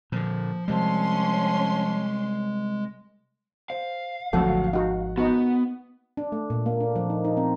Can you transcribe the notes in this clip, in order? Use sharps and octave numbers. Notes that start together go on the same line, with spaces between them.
A#2 D3 F3
C3 F3 G3 G#3 C#4 C6
C5 F5
G#1 D2 F3 F#3 A4 F#5
D#4 F#4 F#5
B3 D#4 F#4
D4
A3
A#2
A#3
D4
F3
D#4
D#4
C4